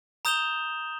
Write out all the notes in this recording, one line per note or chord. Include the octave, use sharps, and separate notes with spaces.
A#5 D#6 G6 E7 F7 G7